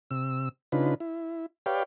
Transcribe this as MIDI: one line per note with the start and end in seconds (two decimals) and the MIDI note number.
0.11 0.49 48
0.11 0.49 88
0.72 0.94 49
0.72 0.94 62
0.72 0.94 63
0.72 0.94 65
0.72 0.94 71
1.00 1.46 64
1.66 1.83 67
1.66 1.83 71
1.66 1.83 73
1.66 1.83 74
1.66 1.83 77
1.66 1.83 79